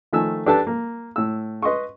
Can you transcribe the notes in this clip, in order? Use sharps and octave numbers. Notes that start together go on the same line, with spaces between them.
D#3 F3 A3 G#5 E6
D4 G4 A4 B4 A5
A#3
A2 E6
B4 D#5 C6 C#6